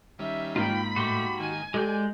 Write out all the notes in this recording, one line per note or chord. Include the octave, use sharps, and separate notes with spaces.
D#3 G3 C#4 E5
G#2 F3 A#3 F4 G5 B5
A2 F#4 G4 C6
D#3 G#5
G#3 G4 A4 D5 G6